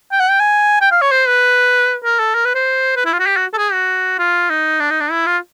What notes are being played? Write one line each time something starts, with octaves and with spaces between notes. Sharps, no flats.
G5
F#5
G5
G#5
G5
F5
C#5
C5
B4
A#4
A4
A#4
B4
C5
B4
E4
F4
F#4
G4
F#4
A4
G#4
F#4
F4
D#4
D4
D#4
D4
E4
F4